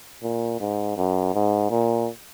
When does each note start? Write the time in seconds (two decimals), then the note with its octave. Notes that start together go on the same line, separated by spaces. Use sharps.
0.23 A#2
0.60 G#2
0.97 F#2
1.34 G#2
1.70 A#2